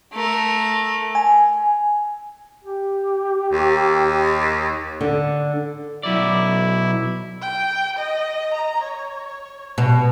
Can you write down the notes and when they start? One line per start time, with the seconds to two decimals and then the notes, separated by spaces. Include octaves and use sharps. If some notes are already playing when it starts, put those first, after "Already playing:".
0.13 A3 A#4
1.15 G#5
2.64 G4
3.52 D#2
5.01 D3
6.03 B1 F#3 E4 D5
7.42 G5
7.97 D#5
8.54 A#5
8.83 C#5
9.78 B2